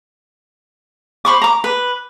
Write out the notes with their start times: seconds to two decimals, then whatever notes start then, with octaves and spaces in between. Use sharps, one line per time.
1.25 C5 B5 C#6 D6
1.42 A#5 D6
1.64 B4